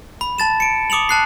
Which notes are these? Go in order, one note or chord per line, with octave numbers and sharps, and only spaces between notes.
B5
A5 A6 E7
C#7 D7
D6 D#6 C#7 F7 F#7
A5 F#6 C7